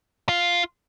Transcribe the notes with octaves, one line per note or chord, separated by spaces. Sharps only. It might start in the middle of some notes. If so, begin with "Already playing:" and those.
F4